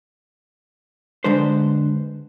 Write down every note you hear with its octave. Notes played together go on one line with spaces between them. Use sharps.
D3 G#3 D4 B4 C5